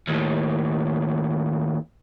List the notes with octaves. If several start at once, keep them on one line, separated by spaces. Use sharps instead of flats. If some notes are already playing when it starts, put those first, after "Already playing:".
D#2 A2